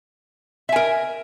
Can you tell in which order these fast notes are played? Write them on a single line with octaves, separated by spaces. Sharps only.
E5 G#5 A#4